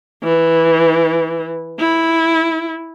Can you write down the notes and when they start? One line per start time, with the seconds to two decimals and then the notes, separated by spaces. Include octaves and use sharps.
0.23 E3
1.80 E4